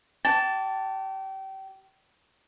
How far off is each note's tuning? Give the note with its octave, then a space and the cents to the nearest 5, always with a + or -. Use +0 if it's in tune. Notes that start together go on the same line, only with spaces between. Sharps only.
G4 -30 A5 +0